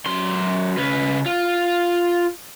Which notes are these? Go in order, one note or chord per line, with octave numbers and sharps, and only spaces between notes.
F#2 C6
C#3 B4
F4